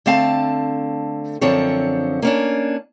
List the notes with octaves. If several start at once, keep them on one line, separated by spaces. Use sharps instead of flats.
D3 A3 C4 F5 A5
F#2 D3 F3 C4 C#5
A#3 C#4 D4